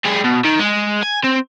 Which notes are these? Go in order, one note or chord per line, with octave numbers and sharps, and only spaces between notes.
G3 G#4
B2
D#3
G#3
G#5
C4